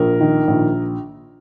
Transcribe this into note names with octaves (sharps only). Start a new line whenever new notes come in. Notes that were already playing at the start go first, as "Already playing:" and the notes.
Already playing: A#1 A#4
D#3
A#1